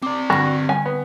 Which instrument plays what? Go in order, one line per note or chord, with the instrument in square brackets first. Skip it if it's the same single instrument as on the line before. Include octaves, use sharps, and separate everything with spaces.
[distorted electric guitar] C4 D5 [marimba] D6
[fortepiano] G2 [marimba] D3 A#6 [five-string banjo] F#4
[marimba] G3 [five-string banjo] G#5
[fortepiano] B3